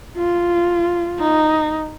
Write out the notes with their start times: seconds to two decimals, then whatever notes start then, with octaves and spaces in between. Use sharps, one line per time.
0.17 F4
1.20 D#4